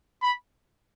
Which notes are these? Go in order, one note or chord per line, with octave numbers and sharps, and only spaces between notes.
B5